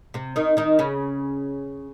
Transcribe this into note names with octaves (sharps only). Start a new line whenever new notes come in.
C3 C4
D#3 D#4
D#3 D#4
C#3 C#4